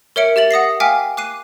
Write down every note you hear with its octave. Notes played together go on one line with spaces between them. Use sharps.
A#4 C#5 E5 C#7 D7
G4 E5 A6 F#7
F#5 D#6 A#6 C7
F5 G5 G#5 D6 F6 B6
D6 F#6 C7 D#7